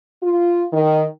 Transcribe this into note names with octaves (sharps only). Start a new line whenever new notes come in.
F4
D#3